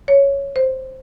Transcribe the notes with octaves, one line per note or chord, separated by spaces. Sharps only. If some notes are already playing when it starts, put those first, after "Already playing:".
C#5
C5